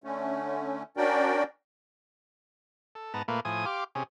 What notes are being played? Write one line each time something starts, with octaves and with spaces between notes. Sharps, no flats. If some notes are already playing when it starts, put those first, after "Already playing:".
D3 A3 C#4
C#4 D4 F#4 A#4 D5 G5
A4
G#2 B3 A5 A#5
A#2 A3 A#3 B4
A2 F3 G#5 D#6
G4 F5 C6 D6
C3 C#4 G#4